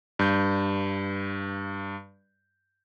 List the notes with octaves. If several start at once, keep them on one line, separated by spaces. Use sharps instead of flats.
G2 G6